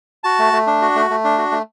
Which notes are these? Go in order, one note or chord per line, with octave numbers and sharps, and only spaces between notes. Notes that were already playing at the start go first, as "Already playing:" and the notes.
F#4 A5
A3
A3
D4
F#4
A3
A3
D4
F#4
A3